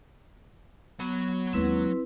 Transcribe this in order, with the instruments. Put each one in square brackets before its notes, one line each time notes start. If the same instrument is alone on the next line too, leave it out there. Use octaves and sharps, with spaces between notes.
[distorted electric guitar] F#3 C#5 [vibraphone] B3
[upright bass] D#2 G#3 [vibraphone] C4 E4 B4